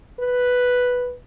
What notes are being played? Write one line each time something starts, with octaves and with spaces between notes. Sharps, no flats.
B4